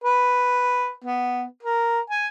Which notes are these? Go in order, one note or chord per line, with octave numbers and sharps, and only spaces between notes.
B4
B3
A#4
G#5